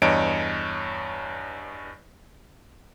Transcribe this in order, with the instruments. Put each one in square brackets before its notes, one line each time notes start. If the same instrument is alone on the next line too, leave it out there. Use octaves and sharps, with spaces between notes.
[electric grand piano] E2 G2 C#5 D#5 D7